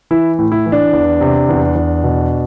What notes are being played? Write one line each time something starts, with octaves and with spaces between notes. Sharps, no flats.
E3 E4
A2
E4
E3
D4
E2
C3
E2
E2
B2